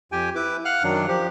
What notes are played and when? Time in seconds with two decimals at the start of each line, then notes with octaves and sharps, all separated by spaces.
0.12 F2 G4 G5 G#5
0.35 E4 B4 D6
0.65 F5 F#5 F6 F#6
0.83 F#2 D#3 F#3 D4
1.08 F3 G4